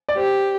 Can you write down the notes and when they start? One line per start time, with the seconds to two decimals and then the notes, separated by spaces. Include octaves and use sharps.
0.09 D5
0.17 G4 C5